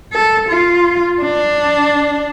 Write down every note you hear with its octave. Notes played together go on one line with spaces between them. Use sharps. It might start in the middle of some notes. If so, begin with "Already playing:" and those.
A4
F4
D4